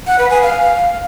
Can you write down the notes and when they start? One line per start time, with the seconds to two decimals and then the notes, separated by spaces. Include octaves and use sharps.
0.07 F#5
0.18 B4
0.30 G#5
0.42 F5